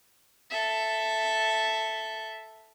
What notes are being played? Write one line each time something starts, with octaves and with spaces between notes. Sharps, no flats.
A4 E5